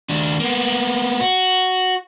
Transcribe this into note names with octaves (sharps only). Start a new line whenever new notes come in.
D#2 D4
A#3 B3
F#4